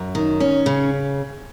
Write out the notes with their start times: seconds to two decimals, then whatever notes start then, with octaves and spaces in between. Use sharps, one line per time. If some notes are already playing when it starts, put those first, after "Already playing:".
Already playing: F#2
0.15 D#3
0.40 C#4
0.66 C#3